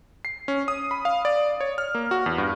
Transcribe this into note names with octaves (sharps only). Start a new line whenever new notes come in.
C7
C#4
D#6
B5
F5
D5
C#5
F6
A#3
F#4
E2
G2